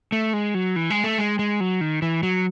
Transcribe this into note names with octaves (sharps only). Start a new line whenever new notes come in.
A3
G#3
F#3
E3
G#3
A3
G#3
G#3
F#3
D#3
E3
F#3